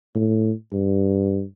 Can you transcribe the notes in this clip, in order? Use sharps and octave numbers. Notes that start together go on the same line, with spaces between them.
A2
G2